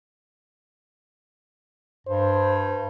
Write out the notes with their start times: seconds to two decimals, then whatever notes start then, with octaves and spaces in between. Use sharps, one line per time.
2.07 G2 C5